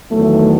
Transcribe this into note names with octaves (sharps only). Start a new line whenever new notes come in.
E2 D#3 F#3 A3